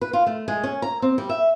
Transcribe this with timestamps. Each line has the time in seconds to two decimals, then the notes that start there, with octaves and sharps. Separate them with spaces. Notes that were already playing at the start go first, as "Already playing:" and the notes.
0.02 B4
0.13 F4
0.27 A3
0.48 G#3
0.64 C#4
0.82 A#5
1.02 C4
1.18 G3
1.29 E5